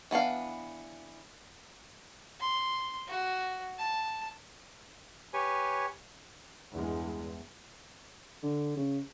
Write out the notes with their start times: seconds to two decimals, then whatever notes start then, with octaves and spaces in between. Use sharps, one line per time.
0.11 E3 B3 D4 F5
2.40 C6
3.08 F#4
3.78 A5
5.33 G4 B4 C#5 G#5
6.74 E2 G2 G#3
8.43 D3
8.77 C#3